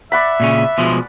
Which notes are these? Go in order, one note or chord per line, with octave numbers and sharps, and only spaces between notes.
D5 E5 F#5 B5
A#2 C#3 C#4
B2 F3 G#3